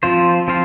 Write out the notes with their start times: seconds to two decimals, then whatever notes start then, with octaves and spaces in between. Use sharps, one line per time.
0.03 F3 C4 F4 C5
0.48 F3 C4 F4 C5